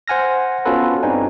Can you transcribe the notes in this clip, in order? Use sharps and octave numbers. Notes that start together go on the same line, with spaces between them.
C5 F#5 G#5 F6 A#6
B3 C#4 F4 F#4 A4 B4
G2 G3 C4 D#4 G#5